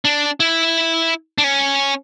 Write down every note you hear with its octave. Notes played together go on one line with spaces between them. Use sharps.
D4
E4
D4
C#4